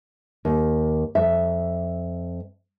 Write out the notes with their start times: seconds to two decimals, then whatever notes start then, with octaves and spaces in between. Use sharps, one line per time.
0.45 D#2
1.15 F2 E5